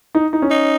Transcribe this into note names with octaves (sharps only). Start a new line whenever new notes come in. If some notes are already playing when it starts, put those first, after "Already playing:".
D#4
D#4
C#4
D#4